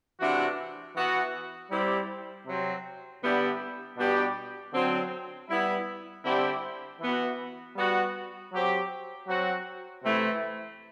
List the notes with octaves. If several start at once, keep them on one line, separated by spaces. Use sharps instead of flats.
C3 E3 A3 D4 F#4
E3 B3 F#4
G3 C4 E4 G4
C3 F#3 C4
D3 G3 B3 E4 G4
B2 G3 B3 D4 G4
D3 F#3 C4
G3 B3 E4
D3 G3 C4 E4 G4
E3 B3 F#4
G3 B3 F#4
F#3 C4 G4
F#3 C4 F#4
C3 E3 A3 C4 E4